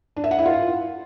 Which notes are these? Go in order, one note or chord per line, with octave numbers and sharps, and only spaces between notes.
D4
E5
F#5
E4
F4